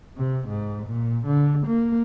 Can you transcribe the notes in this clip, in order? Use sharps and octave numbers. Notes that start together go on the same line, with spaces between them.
C3
G#2
A#2
D3
A#3